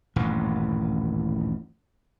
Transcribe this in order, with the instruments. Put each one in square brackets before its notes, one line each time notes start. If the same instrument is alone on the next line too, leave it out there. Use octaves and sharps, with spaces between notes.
[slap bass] D#1 A1 G2